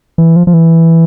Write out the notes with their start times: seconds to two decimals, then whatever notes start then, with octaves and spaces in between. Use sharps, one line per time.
0.18 E3
0.36 F3
0.47 F3
0.54 E3